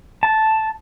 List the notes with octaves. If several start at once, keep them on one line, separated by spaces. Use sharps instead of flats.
A5